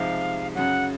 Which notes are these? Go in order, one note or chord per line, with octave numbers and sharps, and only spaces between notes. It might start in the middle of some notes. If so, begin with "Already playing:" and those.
Already playing: C2 C3 F3 G#3 D#4 F5
F#2 C#3 F#3 F#5